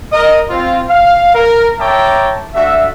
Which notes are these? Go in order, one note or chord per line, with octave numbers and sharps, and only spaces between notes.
A#4 D#5 D#6
C4 F4
F5
A#4
C#5 E5 G5 A5 A#5 D6
A3 D4 F#4 E5